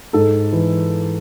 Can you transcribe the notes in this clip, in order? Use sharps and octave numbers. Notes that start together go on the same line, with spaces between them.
G#2 A4
E3